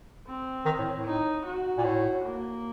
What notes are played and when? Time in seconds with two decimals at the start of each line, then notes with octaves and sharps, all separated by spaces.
0.27 C4
0.66 D#3
0.79 A2
0.93 A2
1.06 D#4
1.45 F#4
1.78 A#2
1.84 A2
2.24 A#3